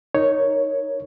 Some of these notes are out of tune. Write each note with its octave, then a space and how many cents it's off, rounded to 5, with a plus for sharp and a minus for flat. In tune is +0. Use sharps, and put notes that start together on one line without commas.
D#4 +0 A#4 +0 C#5 +0